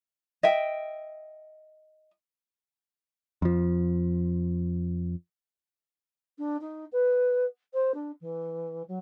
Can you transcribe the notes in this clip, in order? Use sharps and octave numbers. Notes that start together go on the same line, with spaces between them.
D#5 E5 G5
F2 F3
D4
D#4
B4
C5
D4
E3
F#3